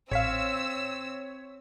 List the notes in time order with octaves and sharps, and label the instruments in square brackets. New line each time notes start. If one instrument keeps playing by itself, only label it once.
[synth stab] A1 F5 [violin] C4 [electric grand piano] C#5 B6 [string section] E6